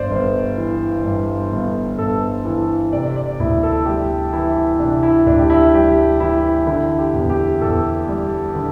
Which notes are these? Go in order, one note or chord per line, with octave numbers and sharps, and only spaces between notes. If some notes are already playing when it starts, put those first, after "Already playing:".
Already playing: G1 G2 C5 D5
G1
E3
G2
G1
G1 A4
E3 A4
C3 D5
D5
D2 E4
A4
G3 G4
E3 E4
C3 D4
E4
D2 D4
G4
E4
G3 G4
E3 E4
D3 E4
G4
E2
G4
E2 A4
G3
D3